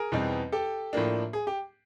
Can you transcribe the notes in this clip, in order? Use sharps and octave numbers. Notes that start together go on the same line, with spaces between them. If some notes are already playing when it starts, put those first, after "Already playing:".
Already playing: G#4 A#4
E2 B2 G3 C4 D#4
G4 A4
A2 F3 A#3 D4
G#4
G4